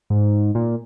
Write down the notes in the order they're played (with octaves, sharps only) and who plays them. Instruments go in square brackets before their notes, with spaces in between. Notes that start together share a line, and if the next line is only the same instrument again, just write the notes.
[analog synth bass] G#2
A#2